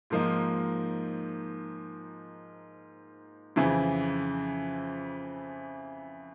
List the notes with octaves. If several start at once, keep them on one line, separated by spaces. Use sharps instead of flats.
G#2 F3 A#3 D#4
F2 C#3 E3